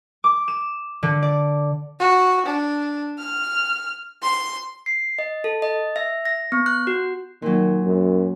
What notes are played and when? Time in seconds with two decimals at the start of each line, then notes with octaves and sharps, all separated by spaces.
0.24 D6
0.48 E7
1.03 D3
1.22 D5
1.99 F#4
2.46 D4
3.18 F6
4.22 C6
4.86 C7
5.19 D#5
5.44 A4
5.62 D#5
5.96 E5
6.25 A#6
6.52 B3
6.66 F#6
6.87 F#4
7.42 A#2 D#3 F#3
7.86 F#2